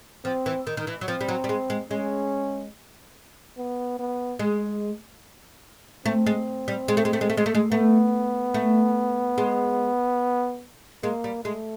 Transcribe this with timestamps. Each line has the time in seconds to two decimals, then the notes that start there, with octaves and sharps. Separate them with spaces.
0.25 F3 C4
0.46 E3
0.67 D#3
0.77 D#3
0.87 E3
1.01 F#3
1.08 F3 C4
1.21 G3
1.28 F#3
1.44 G3
1.49 G#3
1.70 G#3
1.91 G#3 C#4
3.57 B3
3.99 B3
4.39 G#3
6.06 A3 C4
6.27 G#3
6.68 G3
6.88 G#3
6.97 A3
7.05 G#3
7.13 A3
7.21 G#3
7.30 A3
7.37 G#3
7.46 A3
7.55 G#3
7.71 A3 B3
8.54 A3
9.38 G#3
11.03 G#3 A#3
11.24 G3
11.44 G#3 A3